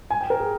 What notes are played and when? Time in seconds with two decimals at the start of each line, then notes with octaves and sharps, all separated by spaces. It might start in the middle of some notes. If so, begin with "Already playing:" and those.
0.10 G#5
0.21 G5
0.30 A#4
0.40 G#4